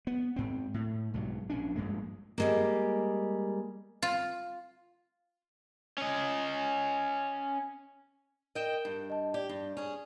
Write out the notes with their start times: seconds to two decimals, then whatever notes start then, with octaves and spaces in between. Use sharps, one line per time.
0.07 B3
0.36 G#2 C4
0.74 A2
1.14 B1 G#2 F#3
1.50 A#1 C#4 D4
1.76 A#1 G2 G#3 A#3
2.38 G3 G#3 A#3
4.02 F4
5.98 C#4 D#5
8.55 A#4 D#5 G5 D7 E7
8.85 G2
9.10 D#5 A5
9.34 G4 D5
9.49 G2
9.77 C#4 G#4